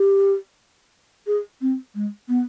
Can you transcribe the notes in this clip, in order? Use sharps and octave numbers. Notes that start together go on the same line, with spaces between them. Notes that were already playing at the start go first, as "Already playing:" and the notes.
Already playing: G4
G#4
C4
G#3
B3